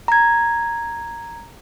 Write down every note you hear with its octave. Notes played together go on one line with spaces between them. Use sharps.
A#5 G#6